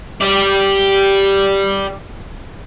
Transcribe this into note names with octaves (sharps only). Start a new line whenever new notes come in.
G4 D5